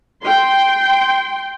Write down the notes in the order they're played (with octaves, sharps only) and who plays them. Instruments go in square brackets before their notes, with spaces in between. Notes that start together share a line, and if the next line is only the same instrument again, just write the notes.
[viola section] G5 C6